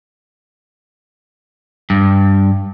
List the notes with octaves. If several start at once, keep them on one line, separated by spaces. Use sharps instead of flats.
G2